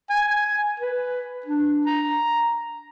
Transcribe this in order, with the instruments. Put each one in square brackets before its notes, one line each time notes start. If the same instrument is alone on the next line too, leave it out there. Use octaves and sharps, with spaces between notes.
[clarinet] G#5
B4
D4
A#5